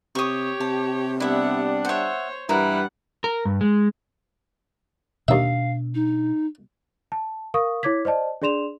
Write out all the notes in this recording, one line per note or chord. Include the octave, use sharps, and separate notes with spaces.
C3 G4 C#5 C#6 D#6
C3 A5
G3 B3 D4 E4 E5 F#5
C5 C#5 E5 F#5
G2 E3 G3 E4 A#4 B4 F#5
A#4
G2
G#3
D#2 B2 D4 E5 F5
D#4
A5
A#4 F5 C#6 D#6
E4 C#5 D6 G#6 B6
C5 D5 D#5 A5
D4 G#4 D5 C6 E7 F7